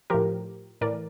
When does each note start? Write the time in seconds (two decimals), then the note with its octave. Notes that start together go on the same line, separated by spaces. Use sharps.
0.10 A2 F3 G4 A#4
0.81 A2 E3 A#4 D5